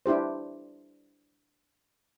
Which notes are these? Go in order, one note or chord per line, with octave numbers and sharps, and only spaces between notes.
D4 E4 G4 C5